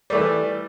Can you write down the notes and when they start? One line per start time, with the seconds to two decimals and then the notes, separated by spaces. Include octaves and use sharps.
0.10 G3
0.13 A3
0.15 E3